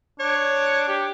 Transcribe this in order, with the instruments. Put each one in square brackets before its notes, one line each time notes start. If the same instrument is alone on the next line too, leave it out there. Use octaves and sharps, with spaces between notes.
[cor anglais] D4 [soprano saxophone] C#5
[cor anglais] G4